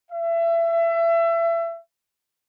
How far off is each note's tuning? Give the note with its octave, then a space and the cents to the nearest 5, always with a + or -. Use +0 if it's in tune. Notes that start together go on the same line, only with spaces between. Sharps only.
E5 +30